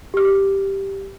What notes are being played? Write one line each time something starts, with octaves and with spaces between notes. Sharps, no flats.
G4 F6